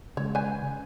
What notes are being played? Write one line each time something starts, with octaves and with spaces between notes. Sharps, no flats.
C#3 G#3 C#5
B4 C5 G#5
C#3